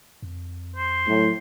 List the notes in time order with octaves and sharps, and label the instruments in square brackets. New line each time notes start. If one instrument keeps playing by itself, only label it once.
[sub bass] F2
[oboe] C5
[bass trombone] A2 [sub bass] F#3